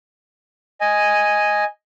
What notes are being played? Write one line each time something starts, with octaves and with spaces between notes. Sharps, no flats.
D#5 G#5